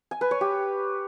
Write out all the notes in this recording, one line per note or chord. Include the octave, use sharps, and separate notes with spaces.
G#5
B4
C#5
G4